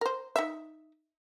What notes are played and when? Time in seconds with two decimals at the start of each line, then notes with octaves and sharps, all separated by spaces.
0.01 A#4 C5
0.36 D#4 E5